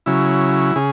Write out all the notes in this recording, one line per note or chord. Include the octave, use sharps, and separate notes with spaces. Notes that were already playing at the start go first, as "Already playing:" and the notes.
C#3 F#3 E4
C#3 G#4